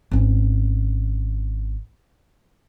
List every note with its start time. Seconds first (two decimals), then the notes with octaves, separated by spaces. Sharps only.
0.11 G#1 C#4